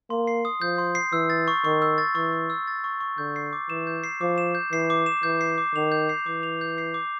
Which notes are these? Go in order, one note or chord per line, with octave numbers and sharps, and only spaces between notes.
A#3 C6
C7
D#6
F3 G6
C6
C7
E3 E6
A6
C#6
D#3 C#6
E6
A6
E3 C#6
C#6
E6
A6
C#6
C#6
D3 G6
C7
D6
E3 E7
G6
C7
F3 D6
E7
G6
E3 C7
D6
E7
E3 G6
C7
D6
D#3 F7
G6
C7
E3 D6
F7
G6
C7
D6